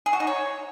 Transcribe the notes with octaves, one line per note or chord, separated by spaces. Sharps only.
G#4
F#4
D#4
C#5